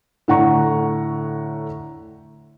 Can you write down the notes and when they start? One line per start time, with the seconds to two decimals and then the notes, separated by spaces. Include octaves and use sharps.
0.28 A2 D3 F#5 A#5 C#6